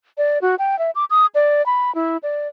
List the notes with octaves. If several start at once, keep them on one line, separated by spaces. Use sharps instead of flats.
D5
F#4
G5
E5
D6
D#6
D5
B5
E4
D5